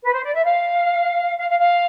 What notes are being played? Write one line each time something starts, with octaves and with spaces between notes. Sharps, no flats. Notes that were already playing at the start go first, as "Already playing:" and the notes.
B4
C5
D5
E5
F5
F5
F5
F5